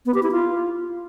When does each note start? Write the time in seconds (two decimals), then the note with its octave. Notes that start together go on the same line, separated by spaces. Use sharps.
0.06 B3
0.14 G4
0.23 E4
0.31 F4